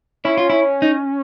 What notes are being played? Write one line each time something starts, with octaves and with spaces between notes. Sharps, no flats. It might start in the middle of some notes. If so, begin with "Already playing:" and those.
C#4 E4
F4
E4
D#4